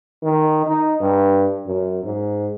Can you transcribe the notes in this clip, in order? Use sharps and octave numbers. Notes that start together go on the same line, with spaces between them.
D#3
D#4
G2
F#2
G#2